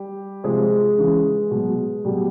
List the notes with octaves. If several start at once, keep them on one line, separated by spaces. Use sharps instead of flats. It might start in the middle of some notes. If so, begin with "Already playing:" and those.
Already playing: G3 G4
C3 F3 G#3 G#4
C#3 E3
B2 F#3
B2 F#3 G3 G4